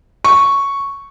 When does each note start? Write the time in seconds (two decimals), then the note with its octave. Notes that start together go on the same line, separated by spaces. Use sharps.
0.24 C#6